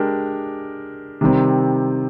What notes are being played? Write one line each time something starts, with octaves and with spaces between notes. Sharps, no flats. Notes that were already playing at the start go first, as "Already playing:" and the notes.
Already playing: G#3 D4 G4 A#4
C3 D#3 G3 C4